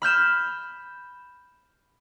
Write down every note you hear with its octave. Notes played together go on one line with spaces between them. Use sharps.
B5 F6 G6 E7